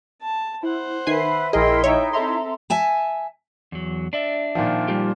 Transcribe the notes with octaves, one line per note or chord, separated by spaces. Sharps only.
A5
E4 C5 F#5
D#3 B4 E5 G#5 C7
A#1 E4 G#4 A#4 D#5 G5 C6
D#4 E4 C#5 E5 G5
C4 A4 E5 A#5 C6
E5 G#5 A5
E2 F#3
D4 D5 E5
A#2 D#3 F3
G3 F4 G4